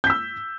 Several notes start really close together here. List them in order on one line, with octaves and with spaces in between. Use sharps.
G6 B6 E6